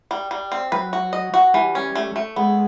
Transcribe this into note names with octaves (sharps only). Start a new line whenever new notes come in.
G3
G3
C4
F#3 B4
F#4
D#5
F#4
E3 G3
C#4
A3
A3
G#3 B3